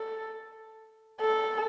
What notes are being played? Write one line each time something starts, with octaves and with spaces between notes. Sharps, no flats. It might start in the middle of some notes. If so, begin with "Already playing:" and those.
Already playing: A4
A4